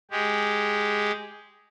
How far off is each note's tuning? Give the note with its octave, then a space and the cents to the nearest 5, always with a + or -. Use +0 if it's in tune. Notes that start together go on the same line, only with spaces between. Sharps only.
G#3 +0 G4 +0